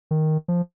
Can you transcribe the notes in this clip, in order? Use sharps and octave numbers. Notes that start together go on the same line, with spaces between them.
D#3
F3